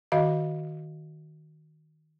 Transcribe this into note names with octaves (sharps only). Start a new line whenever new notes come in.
D#3 F#4 D#5 F5